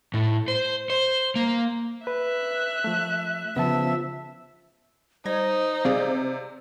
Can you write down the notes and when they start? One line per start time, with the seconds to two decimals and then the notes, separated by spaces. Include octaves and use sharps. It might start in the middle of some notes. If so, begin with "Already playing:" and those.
0.14 A2
0.48 C5
0.90 C5
1.36 A#3
2.07 B4 E5 F#6
2.84 F3 A3
3.57 C#3 F3 B3 E5 A5
5.25 G3 D#4 C5 G#6 A#6
5.85 C3 G#4 D5 F5